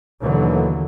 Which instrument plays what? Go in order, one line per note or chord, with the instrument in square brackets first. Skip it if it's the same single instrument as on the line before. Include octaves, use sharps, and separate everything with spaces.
[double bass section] D#2 B2 D3 E3 F#3